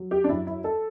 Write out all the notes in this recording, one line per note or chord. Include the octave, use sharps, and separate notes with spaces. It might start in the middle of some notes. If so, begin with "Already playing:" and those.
Already playing: F#3
G4
D4
F#2 E4
E4
A4